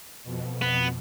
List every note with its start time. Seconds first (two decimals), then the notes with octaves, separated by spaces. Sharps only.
0.24 F2 B2
0.62 B3